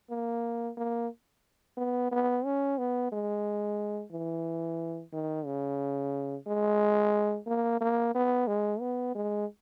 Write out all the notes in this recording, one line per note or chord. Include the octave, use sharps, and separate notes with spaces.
A#3
A#3
B3
B3
C#4
B3
G#3
E3
D#3
C#3
G#3
A#3
A#3
B3
G#3
B3
G#3